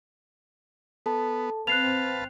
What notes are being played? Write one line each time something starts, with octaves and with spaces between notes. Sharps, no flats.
B3 A4 A5
C4 B4 F5 A5 F#6 G#6 C7 F7